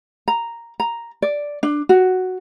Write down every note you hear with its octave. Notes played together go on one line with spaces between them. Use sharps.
A#5
A#5
D5
D4
F#4